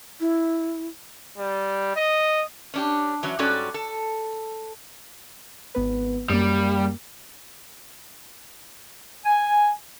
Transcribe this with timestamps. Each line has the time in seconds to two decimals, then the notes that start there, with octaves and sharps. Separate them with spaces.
0.20 E4
1.37 G3
1.96 D#5
2.74 C#4 D4 G4
3.23 E3 F#3 C#4
3.39 G#2 G3 C#4 F#4 A4 D5
3.74 A4
5.75 G#1 B3 B4
6.30 F#2 G3 A#3
9.26 G#5